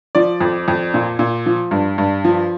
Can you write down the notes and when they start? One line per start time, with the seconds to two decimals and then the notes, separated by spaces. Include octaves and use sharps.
0.15 F3 D5
0.41 F2
0.68 F2
0.94 A#2
1.19 A#2
1.46 F3
1.71 G2
1.98 G2
2.24 F3